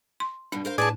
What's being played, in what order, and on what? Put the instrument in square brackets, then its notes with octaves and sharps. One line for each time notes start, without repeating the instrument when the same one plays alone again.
[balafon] C6
[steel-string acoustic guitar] G2 B2 [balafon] D4
[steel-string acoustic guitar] A#4 C5 F5
[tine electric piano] A2 [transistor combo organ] G#4 D5 [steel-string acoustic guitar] B4 C#5 A5